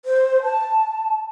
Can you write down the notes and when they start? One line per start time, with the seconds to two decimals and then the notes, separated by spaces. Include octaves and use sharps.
0.05 C5
0.43 A5